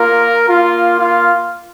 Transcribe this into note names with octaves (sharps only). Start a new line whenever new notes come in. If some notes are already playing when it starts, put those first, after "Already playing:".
Already playing: A#3 F4 A#4
A#3 F4
F4 F5